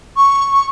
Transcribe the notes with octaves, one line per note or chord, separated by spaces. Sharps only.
C#6